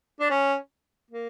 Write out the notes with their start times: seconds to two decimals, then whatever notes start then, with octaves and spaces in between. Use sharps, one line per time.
0.20 D4
0.30 C#4
1.11 A#3